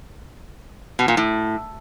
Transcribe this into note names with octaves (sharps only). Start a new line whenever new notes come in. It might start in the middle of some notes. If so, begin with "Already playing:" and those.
B2
A#2
A2